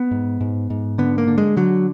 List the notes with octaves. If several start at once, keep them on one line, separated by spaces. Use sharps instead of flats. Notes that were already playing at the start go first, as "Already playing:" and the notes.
Already playing: B3
G#2
G#2
G#2
D3 B3
A#3
D3
G#3
D3 F#3